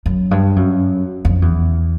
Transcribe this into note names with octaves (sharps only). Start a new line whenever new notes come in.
F#2
G2
F#2
F2
E2